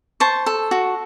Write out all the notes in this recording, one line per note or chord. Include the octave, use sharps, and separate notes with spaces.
C5 A5 C#6
A4
F#4